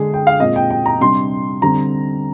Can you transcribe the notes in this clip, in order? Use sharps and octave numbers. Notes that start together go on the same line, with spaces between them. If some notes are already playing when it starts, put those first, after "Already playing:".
Already playing: D3 G#3 D4 G#4
G5
F5
A#2 G#3 C4 D#5
G5
G5
A#5
C3 G3 D4 C6
D3 G3 C4 A#5